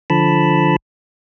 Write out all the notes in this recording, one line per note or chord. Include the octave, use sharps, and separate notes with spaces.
D3 F3 A5 B5